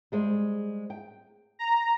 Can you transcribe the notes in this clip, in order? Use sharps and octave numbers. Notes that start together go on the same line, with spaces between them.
G3 G#3 C5
G5
A#5